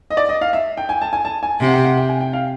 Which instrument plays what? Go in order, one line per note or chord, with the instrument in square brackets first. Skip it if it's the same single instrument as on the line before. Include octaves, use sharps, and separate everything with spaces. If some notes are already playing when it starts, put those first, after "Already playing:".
[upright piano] D#5
D5
D#5
F5
E5
G5
G#5
A5
G#5
A5
G#5
[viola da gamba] C3 [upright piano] G5
[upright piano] F#5
G5
F#5
G5
G#5
G5
F5